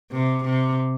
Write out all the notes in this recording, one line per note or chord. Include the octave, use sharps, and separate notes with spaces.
C3
C3